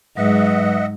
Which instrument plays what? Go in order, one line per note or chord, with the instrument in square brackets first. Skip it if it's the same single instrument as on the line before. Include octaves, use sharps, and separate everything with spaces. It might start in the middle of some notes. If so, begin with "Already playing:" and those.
[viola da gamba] G#2 G#3 [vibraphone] F#3 B4 [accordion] D#5 E5 F#5